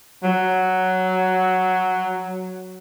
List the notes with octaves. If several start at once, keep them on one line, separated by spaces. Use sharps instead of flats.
F#3